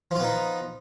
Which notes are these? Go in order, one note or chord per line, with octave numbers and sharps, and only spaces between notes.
F3 B3 D#4 F4